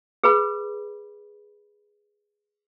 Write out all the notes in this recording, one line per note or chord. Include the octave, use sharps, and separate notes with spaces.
G#4 B4 B5